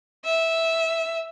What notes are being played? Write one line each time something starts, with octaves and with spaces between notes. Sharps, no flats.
E5